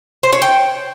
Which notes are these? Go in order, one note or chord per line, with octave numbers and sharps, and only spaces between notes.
C5
C#5
G5